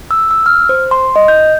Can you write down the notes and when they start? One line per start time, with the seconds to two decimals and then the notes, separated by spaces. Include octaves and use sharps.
0.11 E6
0.31 E6
0.46 F6
0.69 C5
0.91 C6
1.16 D#5
1.28 G6